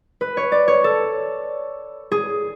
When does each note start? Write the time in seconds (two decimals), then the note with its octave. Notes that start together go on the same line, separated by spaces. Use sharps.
0.21 B4
0.37 C#5
0.52 D5
0.68 C#5
0.84 A4
2.12 G#4